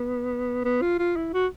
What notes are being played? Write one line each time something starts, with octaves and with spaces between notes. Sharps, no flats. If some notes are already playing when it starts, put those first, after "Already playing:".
Already playing: B3
B3
F4
F4
E4
F#4